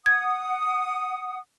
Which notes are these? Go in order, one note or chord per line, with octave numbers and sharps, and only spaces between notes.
F#5 D#6 G#6